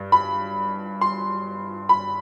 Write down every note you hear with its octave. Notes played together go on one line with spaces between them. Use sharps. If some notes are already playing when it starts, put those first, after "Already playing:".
Already playing: G2
B5
C6
B5